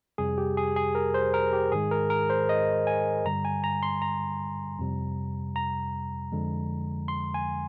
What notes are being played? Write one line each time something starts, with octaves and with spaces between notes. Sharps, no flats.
F2 C3 G3 G#4
G4
G#4
G#4
A#4
C5
A#4
G4
G#2 D#3 G#3 G#4
A#4
A#4
C5
D#5
G#5
G2 D3 G3 A#5
G#5
A#5
C6
A#5
F2 C3 G3
A#5
F2 D3 F3 G#3
C6
G#5